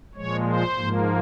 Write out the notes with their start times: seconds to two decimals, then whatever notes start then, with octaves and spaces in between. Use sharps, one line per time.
0.15 A#2 F3 G#3 C#5
0.46 C5
0.76 G#2 F3 A#3